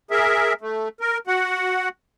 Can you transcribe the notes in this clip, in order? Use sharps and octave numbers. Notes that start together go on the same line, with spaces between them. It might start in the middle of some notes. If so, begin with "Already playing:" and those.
G#4 A#4 E5
A3
A#4
F#4 F#5